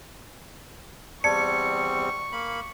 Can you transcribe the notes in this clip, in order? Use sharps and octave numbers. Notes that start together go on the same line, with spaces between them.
E2 G3 C4 D5 A5 C#6 G#6 C#7
A#3 B5